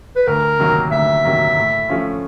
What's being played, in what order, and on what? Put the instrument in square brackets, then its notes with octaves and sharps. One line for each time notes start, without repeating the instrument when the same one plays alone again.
[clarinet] B4
[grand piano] D2 [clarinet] A#4
[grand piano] C3 D#3 F#3 A#3
[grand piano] D2 [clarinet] E5
[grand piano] C3 D#3 F#3 A#3
A2
F3 A3 C#4 F4